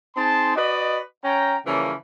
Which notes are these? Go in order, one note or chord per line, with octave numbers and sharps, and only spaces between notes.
C4 D#4 G#4 A5 C6
F#4 B4 D5 D#5
C#4 G5 A#5
C#3 E3 F3 G3 A#3 C#4